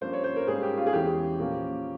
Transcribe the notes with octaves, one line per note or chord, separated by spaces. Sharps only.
G2 F3 A#3 C#4 C5
C#5
C5
A#4
G#2 G3 A#3 C#4 G#4
G4
F4
G#4
E2 E3 G#3 C#4 G4
A#2 F3 A#3 C#4